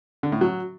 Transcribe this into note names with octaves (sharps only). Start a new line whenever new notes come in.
D3
A2
F#3